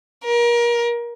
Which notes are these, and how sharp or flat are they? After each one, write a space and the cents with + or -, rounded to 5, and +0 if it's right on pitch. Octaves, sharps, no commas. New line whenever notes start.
A#4 +30